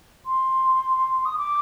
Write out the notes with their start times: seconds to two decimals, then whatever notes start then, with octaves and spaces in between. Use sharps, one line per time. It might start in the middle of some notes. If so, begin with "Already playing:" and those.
0.26 C6
1.25 D#6
1.37 D6